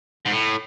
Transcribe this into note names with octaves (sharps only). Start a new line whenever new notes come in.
G#2
A2